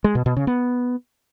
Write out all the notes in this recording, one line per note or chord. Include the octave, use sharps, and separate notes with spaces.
G#3
B2
B2
C#3
B3